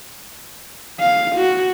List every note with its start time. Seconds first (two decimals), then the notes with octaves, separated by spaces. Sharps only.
1.00 F5
1.36 F#4